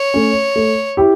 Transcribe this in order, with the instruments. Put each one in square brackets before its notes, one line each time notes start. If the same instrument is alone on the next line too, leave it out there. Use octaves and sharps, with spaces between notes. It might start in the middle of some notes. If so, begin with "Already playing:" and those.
Already playing: [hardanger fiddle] C#5
[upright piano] A3 C#4
A3
E4 G4